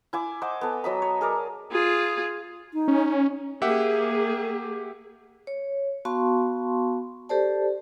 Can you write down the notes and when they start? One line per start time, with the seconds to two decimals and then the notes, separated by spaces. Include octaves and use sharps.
0.13 E4 G#5 D6
0.42 C5 D#5 F#5 D6
0.61 B3 A4
0.84 F#3 D#5 B5
1.02 C#5
1.21 G#4 A#4 D5
1.72 F4 G#4
2.74 D#4
2.88 C#4
3.62 A#3 G4 G#4 E5 F#5
5.47 C#5
6.05 B3 F#4 F5 A5 C6 C#6
7.29 G4 A4 C5 D5 A5